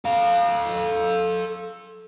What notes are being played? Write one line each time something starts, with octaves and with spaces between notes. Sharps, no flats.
A4 F5